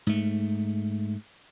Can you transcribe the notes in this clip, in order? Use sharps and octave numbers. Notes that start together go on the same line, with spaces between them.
G#2 A3